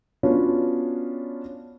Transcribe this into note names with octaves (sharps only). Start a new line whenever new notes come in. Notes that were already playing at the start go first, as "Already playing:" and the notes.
B3 C#4 D4 F4 F#4 C#5